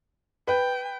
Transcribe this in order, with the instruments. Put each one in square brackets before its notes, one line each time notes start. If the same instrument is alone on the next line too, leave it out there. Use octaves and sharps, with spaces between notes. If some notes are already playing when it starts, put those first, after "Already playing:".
[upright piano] B4 [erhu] G5